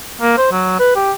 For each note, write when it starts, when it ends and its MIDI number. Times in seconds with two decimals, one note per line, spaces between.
0.21 0.35 58
0.37 0.47 72
0.52 0.75 54
0.79 0.92 71
0.96 1.12 67